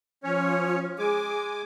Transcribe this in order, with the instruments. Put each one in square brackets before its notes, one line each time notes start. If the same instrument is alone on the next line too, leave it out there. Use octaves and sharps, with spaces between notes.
[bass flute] F3 [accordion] C#4 C#5
[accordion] G#3 G#5 D6 [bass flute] G#4